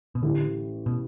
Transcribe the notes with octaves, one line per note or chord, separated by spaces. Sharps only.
B2
A1 A2 D3 A3 G4
B2